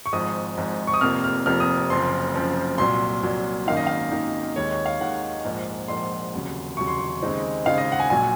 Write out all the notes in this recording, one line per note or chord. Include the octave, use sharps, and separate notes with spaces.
C#6
G#1 G#2 F3 D#6
G#1 G#2 F3
C#6
D#6
F1 F2 C3 F3 A#3 F6
F6
F1 F2 C3 F3 A#3 F6
D#6
F#1 F#2 F3 C4 C6
F#1 F#2 F3 C4
C2 A#2 F#3 C6
C2 A#2 F#3
G#1 F#2 D#3 A#3 D#4 F5
D#5
F5
G#1 F#2 D#3 A#3 D#4
D#2 D#3 G#3 C#5
C#5
F5
D#2 D#3 G#3 F#5
A#1 G#2 F3 A#3
A#1 G#2 F3 A#3 C6
F1 D#2 C#3 F#3
F1 D#2 C#3 F#3 C#6
C6
C#6
D#2 C#3 G#3 C4 D#4
D#2 C#3 G#3 C4 D#4 F5
D#5
F#5
G#5
A#1 A#2 F#3 G#5